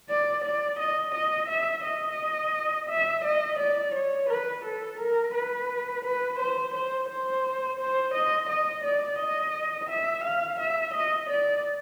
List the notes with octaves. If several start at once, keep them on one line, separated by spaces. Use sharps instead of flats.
D5
D5
D#5
D#5
E5
D#5
E5
D#5
D5
C#5
B4
A4
A#4
B4
B4
C5
C5
C5
C5
D#5
D#5
D5
D#5
E5
F5
E5
D#5
D5